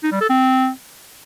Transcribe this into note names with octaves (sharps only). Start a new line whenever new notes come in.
D#4
G3
A4
C4